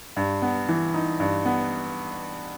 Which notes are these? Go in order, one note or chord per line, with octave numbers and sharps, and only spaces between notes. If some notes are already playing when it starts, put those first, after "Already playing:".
G2
B3
E3
D#4
G2
B3